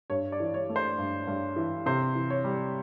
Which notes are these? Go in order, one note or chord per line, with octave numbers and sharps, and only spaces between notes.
G2 C#5
D5
E3
C#5
A3
C5
G2
G2
E3
C3 C5
E3
C#5
G3